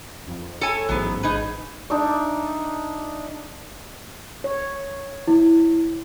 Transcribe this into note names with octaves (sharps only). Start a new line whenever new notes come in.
F2
A4 C#5 G#5
A1 G#2 F#3 B3
D#4 G#4 B4
D4 D#4 E5 D6
C#5
E4